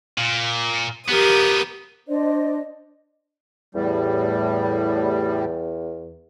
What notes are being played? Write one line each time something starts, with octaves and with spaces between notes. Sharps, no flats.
A#2
F3 B3 G4 A#4 D#6
D4 C5 D5 D#5
E2 A2 G3